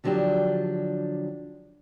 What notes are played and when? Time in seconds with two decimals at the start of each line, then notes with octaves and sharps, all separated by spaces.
0.04 D3 F3 F#3 D4 G4